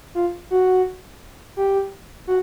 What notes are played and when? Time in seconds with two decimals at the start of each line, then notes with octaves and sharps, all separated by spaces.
0.15 F4
0.50 F#4
1.57 G4
2.27 F#4